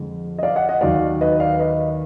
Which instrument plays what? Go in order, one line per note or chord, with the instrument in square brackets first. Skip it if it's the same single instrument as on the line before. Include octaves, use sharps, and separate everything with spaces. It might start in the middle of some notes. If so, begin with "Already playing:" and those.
Already playing: [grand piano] F2 D3 G#3
D#5
D5 F5
D#5 F#5
D#5 F#5
D#2 D#3 F#3 D5 F5
B4 D#5
D5 F5
B4 D#5